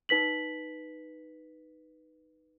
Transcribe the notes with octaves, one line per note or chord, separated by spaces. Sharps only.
D#4 B4 B6 F#7